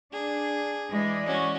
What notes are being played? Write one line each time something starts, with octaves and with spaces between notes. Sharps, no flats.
D4 G#4
E3 G#3 D5 D#5
C#4 F#4